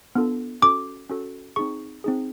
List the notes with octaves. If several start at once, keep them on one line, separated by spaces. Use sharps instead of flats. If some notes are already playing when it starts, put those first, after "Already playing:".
B3 D4 F4 A4
C#4 F#4 A4 D6
C#4 F#4 A4
C4 D#4 G#4 C#6
C4 D#4 G#4